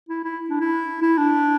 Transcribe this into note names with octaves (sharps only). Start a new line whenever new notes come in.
E4
E4
D4
E4
E4
D4